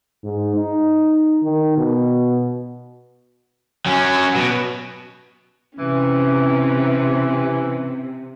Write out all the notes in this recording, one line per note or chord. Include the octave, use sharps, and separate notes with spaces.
G#2
D#4
D#3
B2
F#3 C#4
B2
C3 E3 C#4